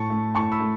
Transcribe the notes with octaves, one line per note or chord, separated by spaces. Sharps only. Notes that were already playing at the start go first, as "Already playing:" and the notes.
Already playing: A2 A5 C#6
A3
A2 A5 C#6
B5 E6
A3